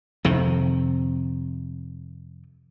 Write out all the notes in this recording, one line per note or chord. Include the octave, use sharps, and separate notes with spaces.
F2 C3 D#3